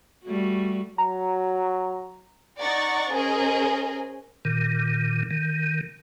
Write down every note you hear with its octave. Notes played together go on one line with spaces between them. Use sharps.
G3 A3 F#4
F#3 A#5
D#4 D5 F#5 A#5 C#6 A6
C#4 G#4 A#4 C5 D#5 G#5
A#2 D#3
D#3